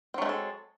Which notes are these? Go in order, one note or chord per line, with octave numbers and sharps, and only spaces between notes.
F#3 G#3 A3 C4 A4